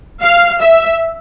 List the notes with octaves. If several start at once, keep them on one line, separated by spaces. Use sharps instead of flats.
F5
E5